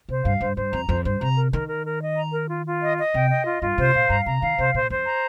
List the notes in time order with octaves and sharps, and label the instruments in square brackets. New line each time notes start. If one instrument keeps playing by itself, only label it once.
[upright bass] C3 [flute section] C5
[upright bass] G2 [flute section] F5
[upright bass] G2 [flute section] C5
[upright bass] G2 [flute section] C5
[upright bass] F2 [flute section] A#5
[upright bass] F2 [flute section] C5
[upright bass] G2 [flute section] C5
[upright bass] C3 [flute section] A#5
[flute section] A#4
[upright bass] D#3 [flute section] A#4
[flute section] A#4
A#4
D#5
A#5
A#4
F4
F4
D#5
D#5
[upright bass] C3 [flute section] G5
[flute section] D#5
F4
[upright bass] G2 [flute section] F4
[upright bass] C3 [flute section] C5
[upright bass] A#2 [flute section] F5
[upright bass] G2 [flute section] A#5
[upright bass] C3 [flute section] A#5
[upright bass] D#3 [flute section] F5
[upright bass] C3 [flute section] C5
[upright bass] A#2 [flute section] C5
[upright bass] F2 [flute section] C5
[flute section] A#5